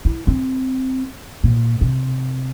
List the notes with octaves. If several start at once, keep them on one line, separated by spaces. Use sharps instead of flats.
E4
C4
A#2
C3